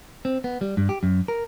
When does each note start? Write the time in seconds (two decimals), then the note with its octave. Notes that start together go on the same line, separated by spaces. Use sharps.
0.25 C4
0.44 B3
0.61 G3
0.77 G2
0.89 G4
1.03 F#2
1.28 A#4